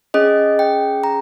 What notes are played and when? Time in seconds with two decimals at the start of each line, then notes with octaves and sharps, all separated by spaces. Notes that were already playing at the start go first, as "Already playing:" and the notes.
0.14 C#4 G#4 D#5
0.59 G5
1.04 A#5